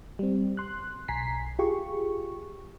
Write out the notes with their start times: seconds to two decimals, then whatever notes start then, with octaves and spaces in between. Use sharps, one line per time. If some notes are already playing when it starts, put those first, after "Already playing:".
0.19 G3 C4
0.57 C6 F#6
1.08 B1 G#5 A#5 B6 C7
1.59 F4 G4 G#4 C#6